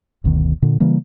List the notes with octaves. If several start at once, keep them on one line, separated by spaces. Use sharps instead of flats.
F#1 D2 B2 D#3
A#2 D3
C#3 E3 G3 A#3